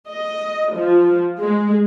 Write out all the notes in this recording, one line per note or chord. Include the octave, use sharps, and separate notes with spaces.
D#5
F3
G#3